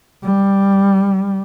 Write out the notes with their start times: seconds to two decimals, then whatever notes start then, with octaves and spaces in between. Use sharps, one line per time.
0.23 G3